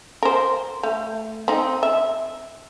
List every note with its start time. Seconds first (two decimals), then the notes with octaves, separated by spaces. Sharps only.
0.23 A#4 C5
0.83 A3
1.48 C4 D#4
1.83 E5